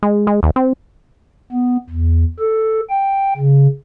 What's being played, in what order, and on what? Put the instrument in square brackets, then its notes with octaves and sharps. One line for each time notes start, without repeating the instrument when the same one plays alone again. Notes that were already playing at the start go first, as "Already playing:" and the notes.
[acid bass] G#3
G#3
D#2
C4
[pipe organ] B3
E2
A4
G5
C#3